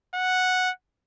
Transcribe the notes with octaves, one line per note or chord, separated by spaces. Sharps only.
F#5